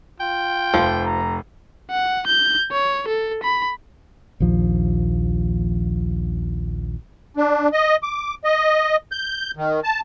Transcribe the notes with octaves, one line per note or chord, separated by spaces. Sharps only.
F4 G5
F1 F3
A#5
F#5
G6
C#5
A4
B5
A#1 D#2 F3
D4
D#5
D6
D#5
G6
D#3
A5